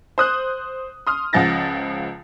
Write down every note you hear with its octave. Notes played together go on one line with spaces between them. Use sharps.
C5 D#6 F#6
C6 D#6 F6
C#2 C#3 F3 F#5 A6 A#6